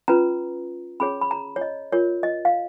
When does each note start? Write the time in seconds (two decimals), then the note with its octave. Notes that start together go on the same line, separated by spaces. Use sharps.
0.08 C#4 F4 B4 A#5
1.00 C#4 G#4 C#5 B5
1.21 B5
1.31 A#5
1.56 C#5
1.61 D#5
1.92 F4 A#4 C#5
2.23 D#5
2.45 F5